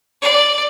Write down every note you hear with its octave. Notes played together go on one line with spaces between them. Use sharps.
D5